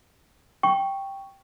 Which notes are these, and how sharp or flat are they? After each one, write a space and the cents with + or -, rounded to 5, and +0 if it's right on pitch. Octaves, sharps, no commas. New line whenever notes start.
G5 +0 C#6 +0